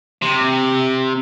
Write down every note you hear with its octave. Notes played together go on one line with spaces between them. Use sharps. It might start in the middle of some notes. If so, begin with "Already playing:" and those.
C3